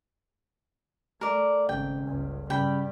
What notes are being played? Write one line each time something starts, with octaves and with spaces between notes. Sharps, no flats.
A3 A#4 D5
G#1 G#2 C#3 G5
G1 C#2
G2 C#3 G3 G5 B5